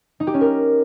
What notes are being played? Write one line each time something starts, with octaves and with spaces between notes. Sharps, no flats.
D#4
G4
C#4
A#4